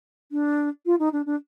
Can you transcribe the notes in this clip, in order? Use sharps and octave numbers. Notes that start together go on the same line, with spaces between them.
D4
F4
D#4
D4
D4